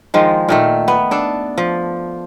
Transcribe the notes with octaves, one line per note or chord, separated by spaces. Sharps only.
D#3 F3 G#3
A#2 D#3 A3
B3
D4 A4
F3